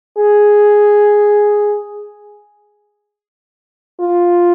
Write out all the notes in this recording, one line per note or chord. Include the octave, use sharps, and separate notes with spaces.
G#4
F4